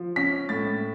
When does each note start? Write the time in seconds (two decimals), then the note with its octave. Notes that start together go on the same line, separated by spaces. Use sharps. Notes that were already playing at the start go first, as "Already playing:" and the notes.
Already playing: F3
0.16 C#4 B6
0.49 A2 A6